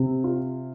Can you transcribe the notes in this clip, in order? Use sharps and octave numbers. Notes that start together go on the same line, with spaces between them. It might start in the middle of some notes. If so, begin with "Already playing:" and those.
Already playing: C3 C4
F4